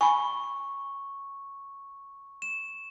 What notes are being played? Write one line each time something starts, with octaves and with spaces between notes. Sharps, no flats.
G#5 B5 C#6
E7